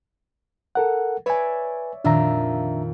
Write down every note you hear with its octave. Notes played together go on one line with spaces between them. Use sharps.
A4 A#4 F#5
B4 C#5 D5 E5 G#5
F2 A#2 D#3 D4 E5 A#5